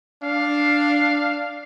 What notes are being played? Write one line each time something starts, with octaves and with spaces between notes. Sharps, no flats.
D4 F5